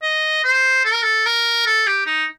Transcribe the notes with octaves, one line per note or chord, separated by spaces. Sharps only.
D#5
C5
A4
A#4
A4
A#4
A4
G4
D#4